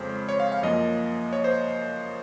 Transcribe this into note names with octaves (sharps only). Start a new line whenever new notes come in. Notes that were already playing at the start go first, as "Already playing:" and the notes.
Already playing: F2 C#3 G#3 C#4 C5
C#5
F5
F5
F#2 F3 A#3 D#5
C#5
C5